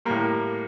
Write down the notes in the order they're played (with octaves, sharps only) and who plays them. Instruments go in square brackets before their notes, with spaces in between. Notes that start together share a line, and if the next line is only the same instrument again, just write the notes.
[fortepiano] A2 G3 A#3